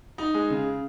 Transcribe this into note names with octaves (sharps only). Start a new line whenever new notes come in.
D#4
G#3
C#3